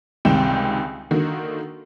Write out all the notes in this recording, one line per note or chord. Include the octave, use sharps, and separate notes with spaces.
C#2 C3 D#3 G3 G5 E7
D3 D#3 A#3 F#4